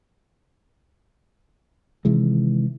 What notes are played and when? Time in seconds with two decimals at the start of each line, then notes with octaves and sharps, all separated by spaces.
2.05 C3 D#3 E3 G#3